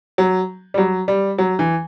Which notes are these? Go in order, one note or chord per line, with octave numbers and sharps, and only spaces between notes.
F#3
G3
F#3
G3
F#3
E3